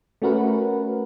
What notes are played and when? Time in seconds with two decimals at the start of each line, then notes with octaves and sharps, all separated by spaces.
0.22 A3 C#4 F#4 A#4 B4